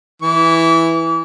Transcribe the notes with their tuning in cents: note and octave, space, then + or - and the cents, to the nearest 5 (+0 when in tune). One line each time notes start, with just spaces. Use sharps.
E3 +0 D6 -40